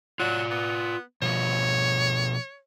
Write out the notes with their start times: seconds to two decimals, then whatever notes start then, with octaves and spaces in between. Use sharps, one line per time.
0.20 F#3 F4 D5
0.50 B3
1.22 B2 F3 C#5